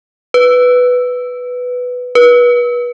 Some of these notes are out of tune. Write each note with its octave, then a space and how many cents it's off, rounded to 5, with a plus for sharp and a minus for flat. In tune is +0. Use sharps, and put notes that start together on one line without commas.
B4 +5
B4 -30